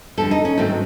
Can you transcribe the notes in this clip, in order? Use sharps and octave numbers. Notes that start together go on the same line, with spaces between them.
F2 D3 G3 A4
D#4
C#4
G#2 D#3 F#3 A3 C4